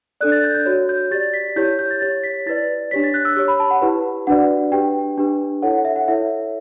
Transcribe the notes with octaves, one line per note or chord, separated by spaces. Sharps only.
D4 A4 D5 F#6
A6
G6
G6
F#4 C#5
G6
G4 D5 A6
B6
E4 G4 C#5 G6
G6
A6
G4 C#5 A6
B6
E4 B4 D5 A6
D4 G4 C#5 B6
A6
F#6
E6
G4 C#5
B5
A5
F#5
E4 G4 B4
D4 F#4 B4 D5 F#5
D4 G4 B4 G5
D4 G4 B4
E4 A4 C#5 F#5
F#5
E5
F#5
E4 A4 C#5 E5